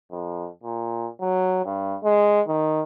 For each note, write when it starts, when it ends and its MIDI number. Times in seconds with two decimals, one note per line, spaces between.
0.12 0.48 41
0.63 1.08 46
1.21 1.61 54
1.65 1.96 43
2.04 2.41 56
2.47 2.83 51